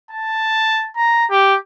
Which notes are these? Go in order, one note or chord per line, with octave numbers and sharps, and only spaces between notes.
A5
A#5
G4